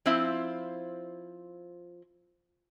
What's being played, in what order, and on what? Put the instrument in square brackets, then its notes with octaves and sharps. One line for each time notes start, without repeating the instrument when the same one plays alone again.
[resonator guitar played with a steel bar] F3 C4 E4 F4